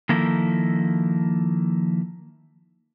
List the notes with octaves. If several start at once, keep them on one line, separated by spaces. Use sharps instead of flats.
D#3 F3 A#3 E4 A4